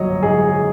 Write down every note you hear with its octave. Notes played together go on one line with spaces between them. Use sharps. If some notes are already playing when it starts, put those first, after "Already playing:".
Already playing: A#1 F#3 C#5 D#5
G#2 G#4